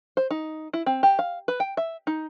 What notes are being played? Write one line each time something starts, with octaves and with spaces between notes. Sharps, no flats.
C5
D#4
E4
C4
G4
F5
B4
G5
E5
D#4